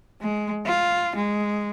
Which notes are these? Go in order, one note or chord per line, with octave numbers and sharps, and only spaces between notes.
G#3
F4
G#3